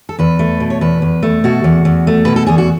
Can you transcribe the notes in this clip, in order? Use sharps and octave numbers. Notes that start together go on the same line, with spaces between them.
A4
E2 B4
A3
B2
C#5
E2 B4
E2
A3
B2 F#4
E2
E2
A3
B2 B4
A4
E2 G#4
F#4